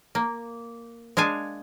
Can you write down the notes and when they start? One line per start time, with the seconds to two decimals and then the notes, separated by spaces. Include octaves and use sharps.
0.15 A#3
1.17 G#3 D4 F5 G#5